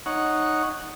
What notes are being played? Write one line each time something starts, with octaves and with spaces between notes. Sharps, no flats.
D#4 C#5 F#5